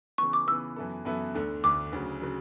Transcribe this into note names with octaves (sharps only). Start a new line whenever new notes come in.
C#3 E3 B3 C#6
D6
C#3 E3 B3 E6
F#2 E3 B3 E4 A4
F#2 E3 B3 E4 A4
D2 D3 A3
D2 D3 A3 D6
D2 C#3 F#3
C#3 F#3